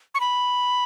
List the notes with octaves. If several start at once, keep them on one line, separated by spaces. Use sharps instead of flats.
C#6
B5